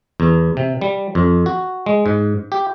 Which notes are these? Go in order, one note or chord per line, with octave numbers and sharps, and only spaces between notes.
E2
C3
G3
F2
F#4
G#3
G#2
G4